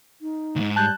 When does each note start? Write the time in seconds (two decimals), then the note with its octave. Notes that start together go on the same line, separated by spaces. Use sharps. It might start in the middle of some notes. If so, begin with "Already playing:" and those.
0.21 D#4
0.56 D2 G#2
0.76 G3 A5 F#6 G6